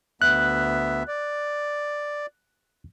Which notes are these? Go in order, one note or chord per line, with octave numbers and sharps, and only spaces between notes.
D2 B3 E5 F#6
D5